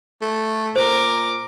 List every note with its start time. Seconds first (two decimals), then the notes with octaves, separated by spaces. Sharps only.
0.22 A3
0.76 A#2 A#4 C5 D6